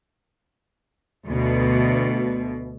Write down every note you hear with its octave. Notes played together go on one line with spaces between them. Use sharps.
D2 B2